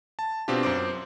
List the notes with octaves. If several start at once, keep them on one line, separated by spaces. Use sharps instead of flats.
A5
B2 C4 D4 F4 G4
F#2 C5 D6